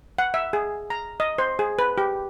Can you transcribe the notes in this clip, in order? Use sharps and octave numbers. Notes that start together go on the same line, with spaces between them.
F#5
E5
G#4
A#5
D#5
C5
G#4
B4
G4